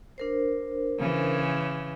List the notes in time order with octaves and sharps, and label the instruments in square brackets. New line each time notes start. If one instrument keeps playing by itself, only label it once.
[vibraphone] D4 A#4 C5
[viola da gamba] C#3 E3